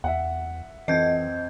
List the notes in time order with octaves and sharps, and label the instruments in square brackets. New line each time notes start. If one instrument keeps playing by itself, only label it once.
[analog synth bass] E2 [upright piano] E5 F#5
[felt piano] F2 C4 [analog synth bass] E3 [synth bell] D#5 G6 G#6